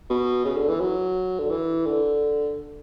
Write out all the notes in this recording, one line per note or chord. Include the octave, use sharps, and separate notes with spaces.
B2
C#3
D3
E3
F#3
D3
E3
D3